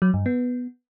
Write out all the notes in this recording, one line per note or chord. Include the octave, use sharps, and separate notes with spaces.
F#3
G2
B3